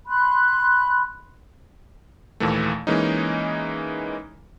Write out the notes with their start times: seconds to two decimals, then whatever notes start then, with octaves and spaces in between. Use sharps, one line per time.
0.07 B5 C6 F#6
2.40 D#2 A#2 E3 A3
2.87 E3 G#3 A#3 C#4 D#4